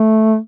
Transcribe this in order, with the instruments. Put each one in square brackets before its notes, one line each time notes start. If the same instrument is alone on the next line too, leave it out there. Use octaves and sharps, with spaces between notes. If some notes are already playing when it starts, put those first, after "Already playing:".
Already playing: [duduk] A3